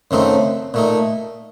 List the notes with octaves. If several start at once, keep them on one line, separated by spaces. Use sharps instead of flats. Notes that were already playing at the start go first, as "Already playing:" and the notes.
F#2 C#3 A3 C4 D#4
A#2 A3 D#4